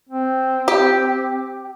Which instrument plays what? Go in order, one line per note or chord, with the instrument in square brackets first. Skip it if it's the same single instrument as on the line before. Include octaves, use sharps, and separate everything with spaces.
[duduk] C4
[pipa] G4